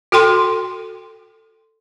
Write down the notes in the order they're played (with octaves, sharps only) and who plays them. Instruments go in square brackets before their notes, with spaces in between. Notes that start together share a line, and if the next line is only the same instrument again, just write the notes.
[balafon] F#4 A4 G5 C6